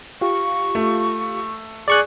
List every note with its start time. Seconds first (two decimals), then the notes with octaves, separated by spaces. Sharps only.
0.21 F4 G4 F5 C#6
0.75 A3
1.88 G#4 D5 C#6 F#6